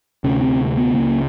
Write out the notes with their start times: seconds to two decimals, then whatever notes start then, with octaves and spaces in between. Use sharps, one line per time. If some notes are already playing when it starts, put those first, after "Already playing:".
0.24 D2 C3 C#4
0.41 C4
0.77 B3
0.94 C#2 C#3 A#3